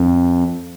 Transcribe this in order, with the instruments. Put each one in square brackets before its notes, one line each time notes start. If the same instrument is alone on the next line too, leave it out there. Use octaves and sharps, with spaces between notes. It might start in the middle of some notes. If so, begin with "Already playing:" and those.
Already playing: [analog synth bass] F2